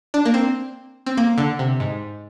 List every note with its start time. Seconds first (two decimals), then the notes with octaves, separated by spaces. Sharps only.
0.14 D4
0.25 A#3
0.34 C4
1.06 C4
1.17 A#3
1.38 D3
1.59 C3
1.80 G#2